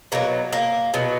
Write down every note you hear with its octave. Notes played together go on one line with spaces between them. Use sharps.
B2 F#3 A#3
A#3
B2 F#3